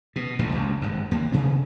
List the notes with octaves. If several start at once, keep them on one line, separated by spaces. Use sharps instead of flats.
B2
E1 A1 A#2 D3
F#1 C#2 F#2
G#1 G2
D#2 A#3
D2 C3 D#3 B3